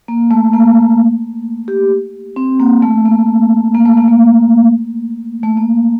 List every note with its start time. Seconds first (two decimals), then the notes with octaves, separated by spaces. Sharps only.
0.08 A#3
0.31 A3
0.54 A#3
1.68 G4
2.36 C4
2.60 A#3
2.82 A3
3.05 A#3
3.75 A#3
3.85 A3
3.97 A#3
4.08 A3
5.43 A3
5.57 A#3